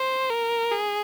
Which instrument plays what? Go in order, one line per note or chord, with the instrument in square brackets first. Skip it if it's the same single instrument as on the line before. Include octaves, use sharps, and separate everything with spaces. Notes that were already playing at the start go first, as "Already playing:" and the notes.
Already playing: [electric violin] C5
A#4
G#4